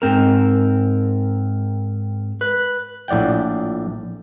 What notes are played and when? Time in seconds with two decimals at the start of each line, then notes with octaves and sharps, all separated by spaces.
0.02 G#2 C4 A#4
2.41 B4
3.08 A#1 A2 D5 F#5 G5